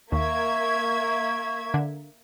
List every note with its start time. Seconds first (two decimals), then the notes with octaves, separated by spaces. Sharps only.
0.12 D#2 A#3 E5 C#6 G#6
1.74 D3